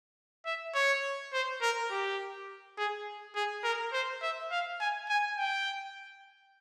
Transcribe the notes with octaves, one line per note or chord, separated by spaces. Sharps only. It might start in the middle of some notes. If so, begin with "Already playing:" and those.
E5
C#5
C5
A#4
G4
G#4
G#4
A#4
C5
E5
F5
G#5
G#5
G5